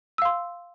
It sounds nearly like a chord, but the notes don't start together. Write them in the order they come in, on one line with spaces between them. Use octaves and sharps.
E6 F5 C6